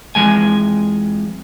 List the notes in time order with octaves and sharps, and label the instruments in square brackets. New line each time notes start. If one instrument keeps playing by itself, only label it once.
[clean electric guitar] F2 E3 G#3 G#5